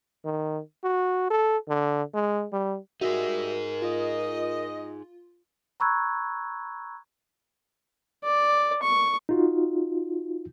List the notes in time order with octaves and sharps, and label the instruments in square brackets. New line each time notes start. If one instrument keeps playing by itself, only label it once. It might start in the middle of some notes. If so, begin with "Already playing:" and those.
[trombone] D#3
F#4
A4
D3
G#3
G3
[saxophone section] G3 D#5 E5 [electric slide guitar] D#4 G#4 [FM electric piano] F#4 [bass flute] A#4
[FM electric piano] F4 [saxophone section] D#5
[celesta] A#5 B5 C#6 E6 F#6 G#6
[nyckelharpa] D5
C#6
[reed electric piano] D#4 F4 F#4